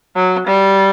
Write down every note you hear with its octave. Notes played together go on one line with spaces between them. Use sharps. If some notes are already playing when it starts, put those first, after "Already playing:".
F#3
G3